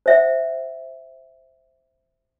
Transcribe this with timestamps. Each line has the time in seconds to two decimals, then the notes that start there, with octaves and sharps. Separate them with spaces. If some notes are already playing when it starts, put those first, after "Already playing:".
0.06 C5 E5 F#5